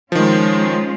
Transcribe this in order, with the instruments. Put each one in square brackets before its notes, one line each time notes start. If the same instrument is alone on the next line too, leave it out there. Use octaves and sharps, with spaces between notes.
[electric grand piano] D#3 F3 [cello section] G#3 C#4 F4